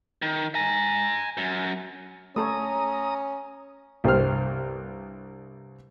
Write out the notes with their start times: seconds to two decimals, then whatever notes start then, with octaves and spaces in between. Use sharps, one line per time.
0.22 D#3
0.55 G#5 A#5
1.37 F#2
2.36 A3 C#4 A4 C#5 A#5 D#6
4.04 C2 G2 G4 C5 F6